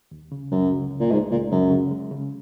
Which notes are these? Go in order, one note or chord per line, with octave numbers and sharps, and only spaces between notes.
D#2
C#3
C#2 F#2
C#3
C#2
A#2
G#2 G#3
C#2 A#2
F#2 C#3
C#3
G#3
C#3